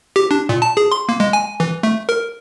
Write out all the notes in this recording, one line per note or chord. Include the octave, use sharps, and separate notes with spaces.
G4
D4
A#2
A5
G#4
C6
A#3
G#3
G#5
E3
A3
A#4